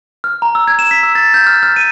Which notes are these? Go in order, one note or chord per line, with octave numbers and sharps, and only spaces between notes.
F6
A#5
E6
G#6
E7
B6
E6
A6
G6
F6
F6
D#7